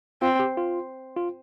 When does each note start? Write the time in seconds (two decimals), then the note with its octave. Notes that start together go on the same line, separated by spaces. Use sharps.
0.22 C4 F4
0.39 G4
0.57 F4
1.17 F4